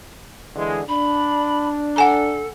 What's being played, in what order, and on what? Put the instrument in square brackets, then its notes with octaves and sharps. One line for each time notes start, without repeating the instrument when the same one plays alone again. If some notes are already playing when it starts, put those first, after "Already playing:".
[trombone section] D3 E3 G#3
[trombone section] D4 [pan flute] B5
[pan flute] A4 [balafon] F#5 G#5 A#5